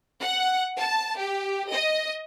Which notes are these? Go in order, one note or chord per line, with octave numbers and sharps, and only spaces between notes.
F#5
A5
G4
D#5